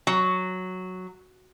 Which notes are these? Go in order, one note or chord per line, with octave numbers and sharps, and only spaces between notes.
F#3